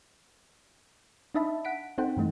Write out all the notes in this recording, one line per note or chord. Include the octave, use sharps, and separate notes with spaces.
D4 D#4 D#5 E5 A5 B5
F#5 B6 D7
C4 D#4 A4 C5 F#5 G5
G2 E3 A3 D#4